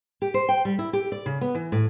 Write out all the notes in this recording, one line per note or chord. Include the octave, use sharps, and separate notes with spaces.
G4
C5
G5
G3
E4
G4
D5
C#3
B3
E3
A2